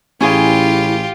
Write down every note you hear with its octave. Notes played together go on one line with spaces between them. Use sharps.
A1 C#4 E4 F4 G4 G#4